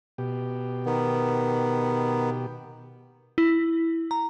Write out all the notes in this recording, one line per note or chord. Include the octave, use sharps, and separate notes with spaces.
B2 G4
D#3 B3
E4
A#5